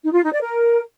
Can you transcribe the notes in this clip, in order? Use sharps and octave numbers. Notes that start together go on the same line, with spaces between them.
D#4
F4
D#4
D5
A#4